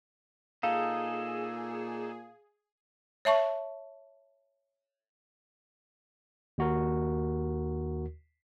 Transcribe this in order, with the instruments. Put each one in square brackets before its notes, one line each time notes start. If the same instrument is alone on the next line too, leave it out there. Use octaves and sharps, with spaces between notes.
[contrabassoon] A#2 [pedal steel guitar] D#4 A4 [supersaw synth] G#4 [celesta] F5
[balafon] C#5 E5 A5 C#6
[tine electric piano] D#2 F#4 A#4